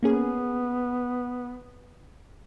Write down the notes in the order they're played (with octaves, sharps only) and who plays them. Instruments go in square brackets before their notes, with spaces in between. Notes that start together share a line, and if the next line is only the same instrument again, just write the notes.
[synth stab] A#3 C#4 G#4 [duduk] B3